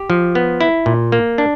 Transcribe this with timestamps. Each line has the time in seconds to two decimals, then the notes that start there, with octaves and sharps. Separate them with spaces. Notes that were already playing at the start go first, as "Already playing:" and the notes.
Already playing: G4
0.10 F3
0.35 B3
0.61 E4
0.86 A#2
1.12 A#3
1.38 D4